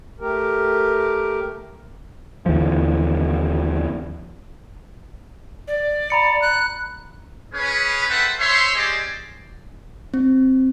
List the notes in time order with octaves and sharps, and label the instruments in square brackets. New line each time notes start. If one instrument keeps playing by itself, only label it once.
[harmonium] A3 G4 A#4
[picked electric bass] D#2 D3 E3 F3
[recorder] D5
[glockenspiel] A#5 B5 C#7
[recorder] F#6
[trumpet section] C#4 G#4 B4
A4 B4 C5 E5 F#5 G5
C5 C#5 E5 C6
C#4 G4 G#4 C5 D5 D#5
[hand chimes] C4